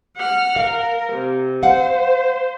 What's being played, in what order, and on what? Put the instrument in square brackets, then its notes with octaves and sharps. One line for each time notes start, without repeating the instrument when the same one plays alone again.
[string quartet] F#5 F6
[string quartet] A#4 [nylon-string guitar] F5
[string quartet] C3
[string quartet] C5 [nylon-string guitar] F5 F#5